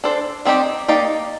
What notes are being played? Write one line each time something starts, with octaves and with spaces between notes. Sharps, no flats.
D4 A4 C5
G3 C4 D#4 G4
A#3 D#4 G4 D5